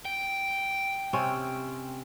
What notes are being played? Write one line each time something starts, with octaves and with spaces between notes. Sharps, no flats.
G5
C3 C4 C#4